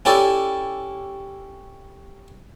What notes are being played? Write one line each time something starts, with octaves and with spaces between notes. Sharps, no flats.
C#4 E4 G4 A4 D5